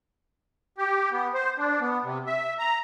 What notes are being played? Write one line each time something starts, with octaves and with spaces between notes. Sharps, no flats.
G4
B3
C5
D4
B3
C3
E5
A#5